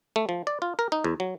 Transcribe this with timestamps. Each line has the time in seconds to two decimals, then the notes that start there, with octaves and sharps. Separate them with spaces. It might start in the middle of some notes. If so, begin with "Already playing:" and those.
0.16 A3
0.29 F3
0.47 D5
0.62 F4
0.79 A#4
0.92 D#4
1.04 E2
1.20 F#3